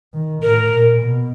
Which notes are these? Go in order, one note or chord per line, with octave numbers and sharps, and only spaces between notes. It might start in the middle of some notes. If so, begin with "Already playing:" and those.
D#3
A2 A#4
A#2
B2